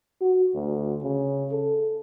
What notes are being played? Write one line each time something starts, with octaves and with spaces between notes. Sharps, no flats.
F#4
D2
C#3
A4